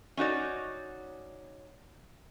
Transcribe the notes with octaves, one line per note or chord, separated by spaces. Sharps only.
C#4 D#4 F#4 D5